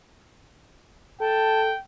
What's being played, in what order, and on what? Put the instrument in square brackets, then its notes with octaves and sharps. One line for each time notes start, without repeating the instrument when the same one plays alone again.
[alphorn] A4 [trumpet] G5 [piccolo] A5